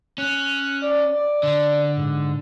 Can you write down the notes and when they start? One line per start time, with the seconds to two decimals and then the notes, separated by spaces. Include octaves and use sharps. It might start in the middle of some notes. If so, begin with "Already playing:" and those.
0.18 C#4 F#6
0.82 D5
1.13 D5
1.43 D3
1.96 G#2